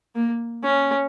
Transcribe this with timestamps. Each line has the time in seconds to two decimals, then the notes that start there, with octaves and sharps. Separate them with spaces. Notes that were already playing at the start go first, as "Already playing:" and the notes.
0.15 A#3
0.64 C#4